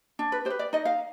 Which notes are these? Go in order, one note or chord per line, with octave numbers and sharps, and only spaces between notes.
D4
B4
G4 C5
B4
D5
D#4 D#5
F5